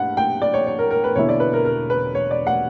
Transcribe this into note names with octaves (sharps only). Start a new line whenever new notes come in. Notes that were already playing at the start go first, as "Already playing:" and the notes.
Already playing: G2 F#5
G5
D5
C#5
C#5
A#4
A#4
B4
E1 E2 D3 A#3 E4 C#5
D5
B4
A#4
A#4
B4
C#5
D5
F#5